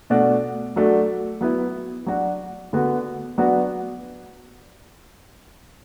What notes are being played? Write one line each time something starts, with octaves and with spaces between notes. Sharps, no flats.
B2 A3 D4 F#4
F#3 A3 D4 F#4
F#3 B3 E4
F#3 D4 F#4
D3 B3 F#4
F#3 B3 D4 F#4